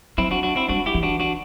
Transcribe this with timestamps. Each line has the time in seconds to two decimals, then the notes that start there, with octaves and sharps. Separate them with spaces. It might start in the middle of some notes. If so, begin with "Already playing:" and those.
0.18 F#3 C4 E4
0.31 D4 F#4
0.43 D4 F#4
0.56 C4 E4
0.68 G3 D4 F#4
0.86 E4 G4
0.94 E3
1.03 D4 F#4
1.20 D4 F#4